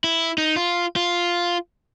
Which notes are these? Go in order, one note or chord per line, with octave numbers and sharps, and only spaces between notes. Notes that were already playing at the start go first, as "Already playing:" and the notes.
E4
D#4
F4
F4